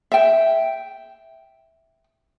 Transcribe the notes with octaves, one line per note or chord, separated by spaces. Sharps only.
E5 G5